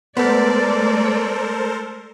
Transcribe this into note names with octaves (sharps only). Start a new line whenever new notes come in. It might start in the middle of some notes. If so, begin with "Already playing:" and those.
G#3 A3 B3 A4 A#4 C5 D5